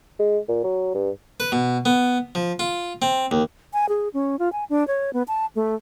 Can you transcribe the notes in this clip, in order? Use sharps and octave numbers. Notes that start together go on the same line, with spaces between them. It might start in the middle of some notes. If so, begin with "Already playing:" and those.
G#3
A#2
F#3
G2
B4
B2
B3
F3
F4
C4
D#2
G#5
G#4
C#4
F4
G#5
D4
C#5
B3
A5
A3